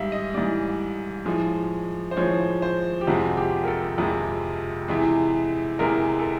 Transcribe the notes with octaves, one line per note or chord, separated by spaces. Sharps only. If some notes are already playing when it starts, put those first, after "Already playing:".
Already playing: G#2 G3 E5 F5
D#5
G#2 E3 G3 D5
A2 F3 G#3
C5
A2 F3 G#3 C#5
C5
G4
F2 C3 F3 G#3 F#4
F#4
G4
A#4
A4
F2 C3 F3 G#3
E2 C3 E3 G#3
E2 C3 E3 G#3 A#4
A4